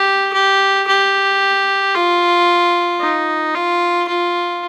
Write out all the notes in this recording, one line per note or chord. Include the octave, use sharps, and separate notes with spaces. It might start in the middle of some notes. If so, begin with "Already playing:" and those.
Already playing: G4
G4
G4
F4
D#4
F4
F4